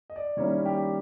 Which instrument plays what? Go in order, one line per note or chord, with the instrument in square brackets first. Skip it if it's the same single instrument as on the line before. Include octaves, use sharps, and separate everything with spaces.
[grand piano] D#5
D5
D#3 G3 A#3 C#4 E4 C#5
G4